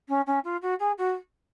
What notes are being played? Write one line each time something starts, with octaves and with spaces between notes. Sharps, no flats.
C#4
C#4
F4
F#4
G#4
F#4